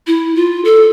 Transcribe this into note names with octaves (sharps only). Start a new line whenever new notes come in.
E4
F4
A4